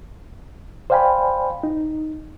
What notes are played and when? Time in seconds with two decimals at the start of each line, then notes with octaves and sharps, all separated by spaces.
0.90 C5 D5 F5 G5 G#5 B5
1.63 D#4